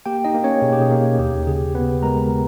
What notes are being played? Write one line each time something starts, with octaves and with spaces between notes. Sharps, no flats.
A#3 G4 G5
D#4 D#5
A#3
C#4 C#5
B2 G#4
G4
G#4
A#3
D#2 G4
C#3 G#4
C#3 B3 B4
G#3 A#4 A#5